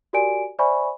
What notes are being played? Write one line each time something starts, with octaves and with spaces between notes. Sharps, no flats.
F#4 G4 A#4 D5 G#5 D7
C5 D5 E5 G#5 B5 C#6